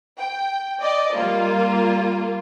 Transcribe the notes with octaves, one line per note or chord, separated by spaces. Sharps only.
G5
D5 D#5
G3 A#3 F4